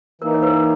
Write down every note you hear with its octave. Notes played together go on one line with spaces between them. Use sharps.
E3 A#3 D#4 A#4
C#5
B4